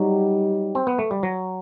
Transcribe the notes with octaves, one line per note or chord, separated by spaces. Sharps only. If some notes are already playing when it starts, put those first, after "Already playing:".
Already playing: F#3 G3 D#4 G4
C4
B3
A3
G3
F#3